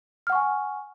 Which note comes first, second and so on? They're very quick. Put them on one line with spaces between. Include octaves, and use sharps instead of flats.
F6 F#5 C#6 G#5